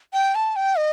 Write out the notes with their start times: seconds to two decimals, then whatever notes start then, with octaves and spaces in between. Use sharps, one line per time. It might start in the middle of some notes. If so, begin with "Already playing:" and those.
0.13 G5
0.35 A5
0.56 G5
0.78 D#5